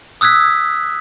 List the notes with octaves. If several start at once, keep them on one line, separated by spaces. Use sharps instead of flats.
D#6 E6 F#6 G#6 B6